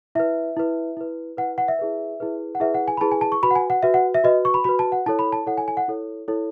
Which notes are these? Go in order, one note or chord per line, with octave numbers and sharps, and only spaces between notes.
E4 B4 E5
E4 B4
E4 B4
E4 B4 F#5
F#5
E5
E4 G#4 B4
E4 G#4 B4
F#5
E4 G#4 B4 E5
F#5
G#5
B5
E4 G#4 B4 A5
G#5
A5
C#6
F#4 B4 B5
F#5
G#5
F#5
F#4 B4 E5
F#5
E5
F#4 B4 D#5
C#6
B5
F#4 B4 B5
A5
F#5
E4 A4 C#5 A5
B5
A5
E4 A4 C#5 F#5
G#5
G#5
F#5
E4 A4 C#5
E4 A4 C#5